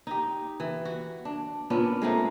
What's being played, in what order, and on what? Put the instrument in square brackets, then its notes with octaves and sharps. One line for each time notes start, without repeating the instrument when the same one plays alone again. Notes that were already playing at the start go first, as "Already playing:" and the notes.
[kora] D#4 G4
E3
F#4
D4
A#2 B3 C#4 D4
G#3 A3 C4 D#4